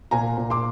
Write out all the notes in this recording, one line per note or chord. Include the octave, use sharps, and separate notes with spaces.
A#2 G#5 A#5
A#2
C6 D6